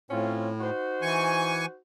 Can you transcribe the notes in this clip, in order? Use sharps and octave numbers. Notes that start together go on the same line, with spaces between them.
A2 C4 C#4 F4
D#4 F#4 C5
E3 G#5 C#6